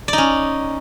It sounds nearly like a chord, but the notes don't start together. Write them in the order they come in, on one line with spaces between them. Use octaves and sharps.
D5 D#4 C#4